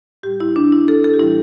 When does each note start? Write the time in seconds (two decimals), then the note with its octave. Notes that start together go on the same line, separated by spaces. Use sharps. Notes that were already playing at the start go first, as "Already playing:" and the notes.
0.23 A2 G3 G4
0.40 E4
0.56 D4
0.72 E4
0.88 A4
1.04 A4
1.14 G4
1.19 A2 E3 G3 E4